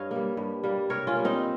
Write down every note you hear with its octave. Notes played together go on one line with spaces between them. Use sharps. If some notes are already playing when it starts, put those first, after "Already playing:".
Already playing: G2 C#5 D#5 F5
G3 A#3
G2
G3 A#3
C3 A#4 C#5
C#4 F4
G3 A#3
C4 D#4